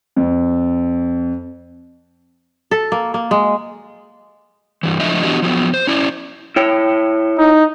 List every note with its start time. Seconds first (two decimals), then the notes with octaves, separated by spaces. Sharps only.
0.16 F2
2.71 A4
2.92 A#3
3.14 A#3
3.31 G#3
4.83 G2 E3
5.00 F3 A3 D4 D#5 E5
5.23 E3 B3 D4 F#4 G4 D#5
5.42 F3 F#3 B3
5.74 C5
5.87 C#4 E4 D5
6.56 E4 C#5 G5
7.38 D#4